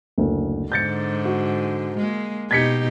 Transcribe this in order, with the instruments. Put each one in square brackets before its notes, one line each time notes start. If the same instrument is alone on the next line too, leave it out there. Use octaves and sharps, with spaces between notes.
[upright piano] F#1 D2
[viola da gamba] G#2 D3 [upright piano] G6 A6 C#7
[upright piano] F#4
[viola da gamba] G#3 A#3
[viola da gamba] B2 D#4 G4 [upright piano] G#6 B6 C#7